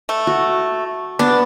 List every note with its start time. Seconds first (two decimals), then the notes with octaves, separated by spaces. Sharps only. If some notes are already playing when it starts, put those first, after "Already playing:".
0.09 A3
0.27 F#4
1.19 B3 D4